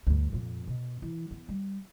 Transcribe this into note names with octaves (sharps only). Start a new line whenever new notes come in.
G1 D2
F2 A#2
B2
E3
B3
G3